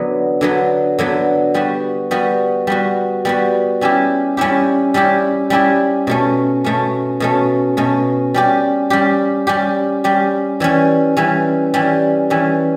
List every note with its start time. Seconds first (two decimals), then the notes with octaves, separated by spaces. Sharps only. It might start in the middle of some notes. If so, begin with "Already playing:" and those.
Already playing: D3 F#3 B3
0.41 D3 F#3 B3
0.99 D3 F#3 B3
1.54 G3 B3 F#4
2.11 G3 B3 F#4
2.67 G3 B3 F#4
3.25 G3 B3 F#4
3.81 G3 C#4 E4 G4
4.37 G3 C#4 E4 G4
4.94 G3 C#4 E4 G4
5.50 G3 C#4 E4 G4
6.07 B2 A3 C#4
6.64 B2 A3 C#4
7.20 B2 A3 C#4
7.77 B2 A3 C#4
8.34 G3 C#4 G4
8.90 G3 C#4 G4
9.47 G3 C#4 G4
10.04 G3 C#4 G4
10.60 E3 G3 C#4
11.17 E3 G3 C#4
11.74 E3 G3 C#4
12.30 E3 G3 C#4